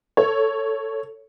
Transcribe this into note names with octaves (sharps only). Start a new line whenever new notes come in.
A4 C#5